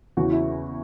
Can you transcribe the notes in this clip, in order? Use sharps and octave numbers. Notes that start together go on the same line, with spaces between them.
E2 C#3 E3 F#4
E4